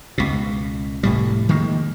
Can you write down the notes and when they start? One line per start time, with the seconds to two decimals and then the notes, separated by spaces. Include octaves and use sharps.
0.18 C#2 B2
1.03 F1 A2 G3
1.49 D#3 F3 G#3 A#3